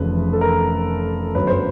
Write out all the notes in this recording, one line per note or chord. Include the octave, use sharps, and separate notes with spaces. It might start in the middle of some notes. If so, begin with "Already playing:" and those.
Already playing: F1 F2 C#3 E3 B4
A4
A#4
G1 F#2 D3 B4
C5